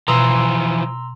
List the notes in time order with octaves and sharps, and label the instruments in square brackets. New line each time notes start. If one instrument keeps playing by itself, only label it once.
[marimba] B2 [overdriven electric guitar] E3 F3 [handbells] A#5 C6 E6